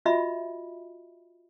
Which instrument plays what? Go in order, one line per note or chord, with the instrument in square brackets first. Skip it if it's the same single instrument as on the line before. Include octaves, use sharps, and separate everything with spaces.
[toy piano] F4 F#4 D#5 E5 B5